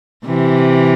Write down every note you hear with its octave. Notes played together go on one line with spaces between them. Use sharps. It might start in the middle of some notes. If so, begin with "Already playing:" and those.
C3 E3